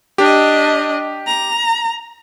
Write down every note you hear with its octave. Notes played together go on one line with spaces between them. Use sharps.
D4 G4 D#5
A#5